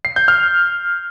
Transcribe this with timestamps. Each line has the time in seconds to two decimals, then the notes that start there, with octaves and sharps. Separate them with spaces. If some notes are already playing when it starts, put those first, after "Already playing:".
0.05 C7
0.16 G6
0.28 F6